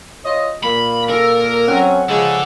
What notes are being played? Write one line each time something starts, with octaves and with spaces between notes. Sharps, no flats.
F4 C#5 D#5
A#2 A#3 B5
A4 A#4
F#3 C4 C#4 F#5
C#3 F3 G#3 D4 A4